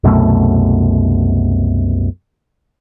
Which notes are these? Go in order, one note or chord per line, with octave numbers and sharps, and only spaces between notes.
C2 F#2 B2 A3